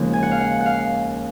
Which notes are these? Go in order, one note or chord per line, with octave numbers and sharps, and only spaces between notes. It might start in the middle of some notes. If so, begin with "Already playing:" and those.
Already playing: D#2 C#3 F3 G#3
G#5
F#5
F5
F#5
F#5
F5